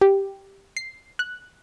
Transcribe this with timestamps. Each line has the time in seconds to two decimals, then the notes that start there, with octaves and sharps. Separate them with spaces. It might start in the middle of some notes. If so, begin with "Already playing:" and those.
0.01 G4
0.77 C7
1.19 F#6